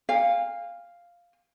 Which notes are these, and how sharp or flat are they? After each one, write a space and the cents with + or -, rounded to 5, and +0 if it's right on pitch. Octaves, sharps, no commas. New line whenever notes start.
F5 +0 G#5 -45